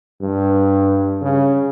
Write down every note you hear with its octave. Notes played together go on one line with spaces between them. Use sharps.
G2
C#3